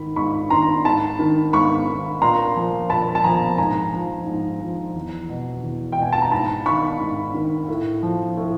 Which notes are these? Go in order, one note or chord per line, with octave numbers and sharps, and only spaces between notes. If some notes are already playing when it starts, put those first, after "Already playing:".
Already playing: G#2 D#3 B5
G#2 B5 C#6
D#3 A#5 C6
G#2 A5 B5
D#3
G#2 B5 C#6
D#3
A#2 A#5 C6
F3
A#2 A5 B5
A5
F3 G#5 A#5
G#2 G#5 A#5
F3
G#2
F3
E2
B2
E2
G5
B2 G#5
A5
A#5
G#2 A5 B5
D#3 B5 C#6
G#2
D#3
A2
F3
A2